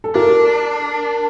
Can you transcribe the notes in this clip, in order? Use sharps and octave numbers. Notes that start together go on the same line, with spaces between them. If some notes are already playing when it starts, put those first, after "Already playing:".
A4
D4 A#4